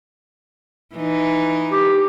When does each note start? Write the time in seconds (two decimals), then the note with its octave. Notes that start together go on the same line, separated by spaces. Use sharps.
0.96 E3 D#4
1.72 G4